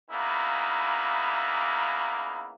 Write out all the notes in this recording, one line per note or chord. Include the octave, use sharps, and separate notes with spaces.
C#3 E3 A#3 B3 D#4 E4